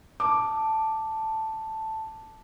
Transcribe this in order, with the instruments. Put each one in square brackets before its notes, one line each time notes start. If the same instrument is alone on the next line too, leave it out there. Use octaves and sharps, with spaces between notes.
[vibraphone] A5 [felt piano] D6